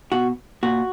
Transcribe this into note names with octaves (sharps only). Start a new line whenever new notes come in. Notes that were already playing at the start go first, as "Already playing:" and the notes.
B2 F#4
A#2 F#4